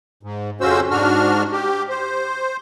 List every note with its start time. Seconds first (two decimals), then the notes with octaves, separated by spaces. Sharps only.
0.23 G#2
0.61 F2 C#3 C#4 F#4 C5 E6
0.91 G#2 D4 F#4 F6
1.52 G4
1.89 C5